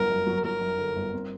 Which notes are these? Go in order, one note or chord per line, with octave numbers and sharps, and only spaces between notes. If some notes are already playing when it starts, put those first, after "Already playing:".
Already playing: G1 F#3 A#4
F#2
F#3
F#3 A#4
F#2
D3
G1
C4